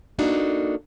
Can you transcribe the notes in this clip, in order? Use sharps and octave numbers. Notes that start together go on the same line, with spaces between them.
A#3 D4 D#4 F#4 A4